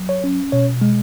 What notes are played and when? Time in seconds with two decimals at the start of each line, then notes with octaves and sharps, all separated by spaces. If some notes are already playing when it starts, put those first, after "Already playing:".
Already playing: F#3
0.09 C#5
0.24 C#4
0.52 B2 C#5
0.81 G#3